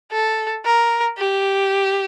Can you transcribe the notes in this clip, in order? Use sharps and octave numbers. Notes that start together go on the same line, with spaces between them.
A4
A#4
G4